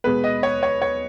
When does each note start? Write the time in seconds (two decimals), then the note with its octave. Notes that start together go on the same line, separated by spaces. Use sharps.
0.04 B2 G#3 B3 B4
0.24 D#5
0.43 C#5
0.63 C#5
0.82 C#5